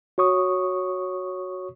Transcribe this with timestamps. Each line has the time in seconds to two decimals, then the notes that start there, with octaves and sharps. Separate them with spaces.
0.18 F#4 C#5 C#6 D#6